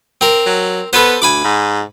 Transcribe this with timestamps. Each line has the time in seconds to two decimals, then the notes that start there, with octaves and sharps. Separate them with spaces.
0.21 C4 A#4
0.46 F#3
0.93 B3 A4 B4 C5
1.22 D2 G#5 B5 D6
1.44 G#2